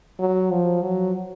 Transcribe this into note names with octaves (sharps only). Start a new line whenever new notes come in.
F#3
F3
F#3